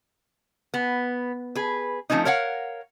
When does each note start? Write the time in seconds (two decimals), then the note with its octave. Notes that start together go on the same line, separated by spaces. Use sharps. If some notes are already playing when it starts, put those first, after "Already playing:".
0.74 B3
1.55 G#4 B4
2.10 F3 A3 C4 C#4 D#4
2.25 A#4 C#5 F5 F#5